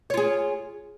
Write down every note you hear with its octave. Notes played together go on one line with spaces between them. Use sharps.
F4 G#4 C#5